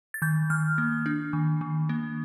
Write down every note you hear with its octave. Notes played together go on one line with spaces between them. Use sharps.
A6
D#3 G6
D#3 F6
A#3
D4
D#3
D#3
A#3